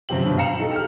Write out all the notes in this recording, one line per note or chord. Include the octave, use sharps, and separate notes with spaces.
F#2 C3 F3 C4 G4 F#7
G2 B2
F5 G5 A#5 C#7 E7
D#4 F#4 A4
G4 F6